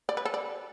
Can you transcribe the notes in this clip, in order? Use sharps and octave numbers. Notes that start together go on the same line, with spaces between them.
D5
B4
A4
D5